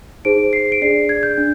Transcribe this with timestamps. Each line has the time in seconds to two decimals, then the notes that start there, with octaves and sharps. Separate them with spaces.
0.25 D#4 G#4 C5 D7
0.53 C7
0.72 D7
0.82 D4 G#4 D5 C7
1.09 G#6
1.23 G6
1.38 D4